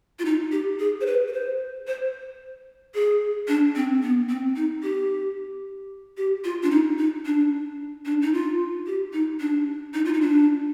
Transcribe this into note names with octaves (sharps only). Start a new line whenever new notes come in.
F4
D#4
G4
G#4
C5
B4
B4
C5
C5
G#4
D4
C4
B3
C4
D#4
G4
G4
F4
D4
D#4
D#4
D4
D4
D#4
F4
G4
D#4
D4
D#4
F4
D#4
D4